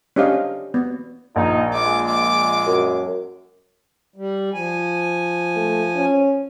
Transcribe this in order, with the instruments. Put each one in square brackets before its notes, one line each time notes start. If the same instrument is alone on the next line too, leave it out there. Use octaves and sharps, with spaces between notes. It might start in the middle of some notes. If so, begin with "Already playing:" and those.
[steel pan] C#4 D4 G4 C5 D#5 F5
B3
[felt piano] A#1 [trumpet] D#4
[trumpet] G#3 [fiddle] D6
[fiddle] D6
[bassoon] F#2
[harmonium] G3
F3 G#5
[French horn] A3
C#4